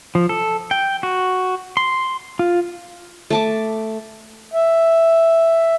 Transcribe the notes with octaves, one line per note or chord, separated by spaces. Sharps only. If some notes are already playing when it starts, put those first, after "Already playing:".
F3
A4
G5
F#4
C6
F4
A3 A5 D6
E5